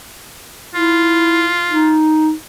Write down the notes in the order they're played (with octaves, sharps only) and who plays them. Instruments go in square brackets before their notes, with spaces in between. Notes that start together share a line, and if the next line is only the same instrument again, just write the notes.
[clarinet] E4 [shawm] F4
[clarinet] D#4